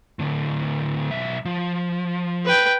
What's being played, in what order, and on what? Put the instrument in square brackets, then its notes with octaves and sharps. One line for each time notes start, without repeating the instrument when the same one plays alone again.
[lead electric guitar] A2 D3
B1 E5
F3
[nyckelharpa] B4 G5